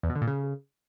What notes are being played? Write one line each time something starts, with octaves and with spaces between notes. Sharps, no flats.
E2
B2
D3
A#2
C#3